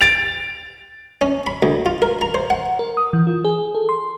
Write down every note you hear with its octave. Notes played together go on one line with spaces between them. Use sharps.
A6 D7 F7
C#4
B5
D2
F4
A#4
A#5
C5
F#5
A#4
D#6
E3
F4
G#4
A4
C6